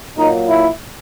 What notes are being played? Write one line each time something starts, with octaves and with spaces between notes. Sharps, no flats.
A#2 F#3 A#3 D#4
E4